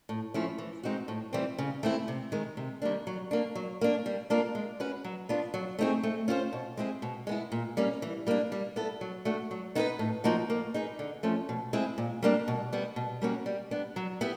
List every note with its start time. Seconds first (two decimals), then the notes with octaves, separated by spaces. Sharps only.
0.09 A2
0.34 F3 A3 C#4 E4
0.58 E3
0.83 G#3 C4 D#4 F#4
1.08 A2
1.33 E3 G3 C4
1.58 C#3
1.83 E3 A3 C4 E4
2.08 C3
2.32 D#3 G#3
2.57 C3
2.82 D#3 G3 A#3 D4
3.07 F#3
3.31 A#3 D4
3.55 F#3
3.81 A#3 D4
4.06 G3
4.30 A#3 D4 F4 A#4
4.55 G#3
4.80 C#4 F#4 B4
5.04 F#3
5.29 B3 D4 F4
5.54 F#3
5.79 A3 C4 D#4 G#4
6.03 A3
6.28 C#4 F4 G#4 C5
6.53 B2
6.77 G#3 C4 E4 G#4
7.02 B2
7.27 G#3 B3 E4
7.52 A#2
7.77 G3 A#3 C#4
8.02 E3
8.27 G3 A#3 D4
8.52 G3
8.76 B3 E4 A4
9.01 F#3
9.25 A3 D4 F#4
9.51 F#3
9.75 B3 D#4 G#4 B4
9.99 A2
10.24 F3 A#3 D#4 F#4
10.50 A#3
10.74 D#4 G#4 B4
10.99 D3
11.23 F3 A3 C#4
11.49 B2
11.73 G#3 C4 E4 G#4
11.98 A#2
12.22 G3 A#3 D4
12.48 B2
12.73 G3 B3
12.96 B2
13.22 G3 A#3 C#4 F#4
13.46 G3
13.71 B3 D4
13.96 F#3
14.21 B3 E4 G4